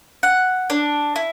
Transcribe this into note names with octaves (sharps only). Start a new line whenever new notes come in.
F#5
D4
E4